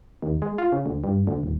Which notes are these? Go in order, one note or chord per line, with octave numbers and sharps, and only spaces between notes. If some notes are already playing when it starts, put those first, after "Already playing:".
D#2
G#3
F4
C#3
D2
G2
D2
D#1